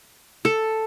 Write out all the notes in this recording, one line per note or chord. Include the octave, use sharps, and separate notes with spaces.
A4